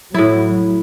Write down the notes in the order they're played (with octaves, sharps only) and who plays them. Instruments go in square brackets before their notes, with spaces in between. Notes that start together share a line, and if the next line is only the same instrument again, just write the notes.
[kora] A2 E4 [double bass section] F#3